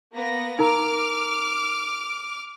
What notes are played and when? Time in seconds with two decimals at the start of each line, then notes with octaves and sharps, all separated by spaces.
0.14 A#3 B3 A#6
0.59 D#4 A#4 A#5 D6 F6